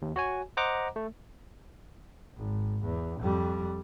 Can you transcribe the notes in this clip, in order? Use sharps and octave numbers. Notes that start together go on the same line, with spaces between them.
D#2
F#4 C#5 G#5
C5 D#5 F#5 A#5 D6
A3
G#1
E2
F2 G3